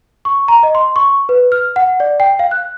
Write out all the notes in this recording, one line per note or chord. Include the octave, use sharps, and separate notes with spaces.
C#6
A#5
D#5
C6
C#6
B4
F6
F#5
D5
G5
F5
F#6